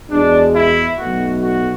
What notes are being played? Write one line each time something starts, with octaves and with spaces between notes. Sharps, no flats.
E2 B2 G#3 D4
E4
B1 B2 A3 F#4
F#4